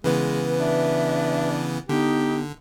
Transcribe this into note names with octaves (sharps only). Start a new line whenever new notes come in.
C#3 E3 G#3 B3 B4
D4 E5
D3 B3 D#4 G4